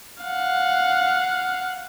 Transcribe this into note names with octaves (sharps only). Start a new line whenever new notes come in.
F5 F#5